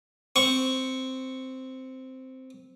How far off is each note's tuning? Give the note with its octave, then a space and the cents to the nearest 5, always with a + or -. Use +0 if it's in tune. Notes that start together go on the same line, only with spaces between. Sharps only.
C4 -5 C#6 +0